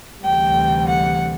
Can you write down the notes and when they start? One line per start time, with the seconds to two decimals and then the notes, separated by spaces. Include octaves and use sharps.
0.24 D2 C3 E3 G3 G5
0.88 F#5